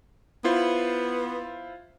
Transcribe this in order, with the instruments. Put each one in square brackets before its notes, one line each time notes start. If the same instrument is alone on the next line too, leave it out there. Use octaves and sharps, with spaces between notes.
[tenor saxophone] B3 [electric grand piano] E4 F4 C5